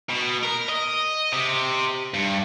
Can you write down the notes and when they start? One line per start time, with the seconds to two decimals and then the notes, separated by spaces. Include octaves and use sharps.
0.09 B2
0.43 A#4
0.69 D#5
1.33 C3
2.14 G2